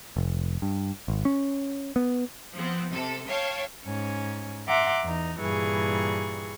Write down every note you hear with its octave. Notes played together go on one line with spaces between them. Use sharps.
F1
G2
G#1
C#4
B3
F3 B3 C4
C3 A4
C#5 F5 G5 A5
G#2 C#4
E5 F#5 A#5 C6 D6
E2 D#4
G2 A#2 E3 G3 G#4 C#6